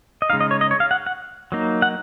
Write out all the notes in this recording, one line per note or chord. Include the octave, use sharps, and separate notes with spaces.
D#5
C#3 G#3 D#4 F5
D#5
C#5
D#5
C#5
F5
F#5
F#5
F#3 A#3 D#4
F#5